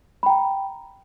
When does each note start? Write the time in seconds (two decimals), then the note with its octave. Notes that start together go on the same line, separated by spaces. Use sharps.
0.23 B5
0.26 G5
0.30 A#5